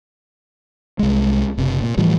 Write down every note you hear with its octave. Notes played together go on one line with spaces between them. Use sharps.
C2 G#3
F#1 C3
A#2
A2 E3 F3 G3